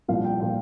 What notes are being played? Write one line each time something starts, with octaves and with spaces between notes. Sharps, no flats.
C2 A#2 F3 F5
G5
A#2 F3 G5